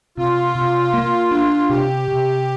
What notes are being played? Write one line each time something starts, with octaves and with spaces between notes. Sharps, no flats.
C3 F4
C3
A#3
D4
C3 G4
C3